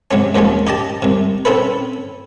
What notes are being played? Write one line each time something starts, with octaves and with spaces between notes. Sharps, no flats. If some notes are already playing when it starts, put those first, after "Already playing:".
C3 F#3 G#3 C#4
D#2 F3 F#3 G#3 C#4
D#4 G4 D#5 A5
C2 C3
C4 C#4 E4 A4 B4